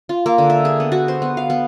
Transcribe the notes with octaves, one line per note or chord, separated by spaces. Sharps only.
F4
A#3
D3
E5
G#4
B3
F#4
C5
B3
F5
B3